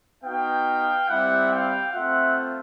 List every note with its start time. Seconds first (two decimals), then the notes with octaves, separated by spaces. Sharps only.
0.23 B3 D#4 F#4 F5 G5
1.08 G3 C4 E4 G4 E5 F#5
1.51 F5 G5
1.93 A3 C4 F4 E5 F#5